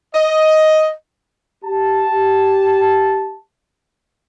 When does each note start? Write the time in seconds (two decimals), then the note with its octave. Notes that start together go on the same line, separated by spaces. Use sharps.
0.14 D#5
1.64 G4 A5